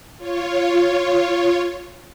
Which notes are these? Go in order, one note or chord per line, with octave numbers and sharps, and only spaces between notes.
F4 C#5